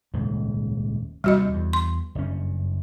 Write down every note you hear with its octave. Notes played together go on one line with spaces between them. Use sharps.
D#1 C#2 G#2
D#2 C3 G3 F#4 D#5
E2
C6
F#1 G2 C#4